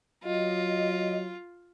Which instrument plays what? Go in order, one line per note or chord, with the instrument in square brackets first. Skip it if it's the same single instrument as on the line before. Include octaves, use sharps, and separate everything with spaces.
[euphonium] F#3 [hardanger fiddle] F4 [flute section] D#5